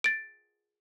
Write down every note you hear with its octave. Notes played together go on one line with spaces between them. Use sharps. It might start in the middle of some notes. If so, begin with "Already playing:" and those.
A6 D7